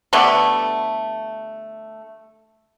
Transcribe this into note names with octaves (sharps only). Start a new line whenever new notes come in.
D3 G3 A3 B3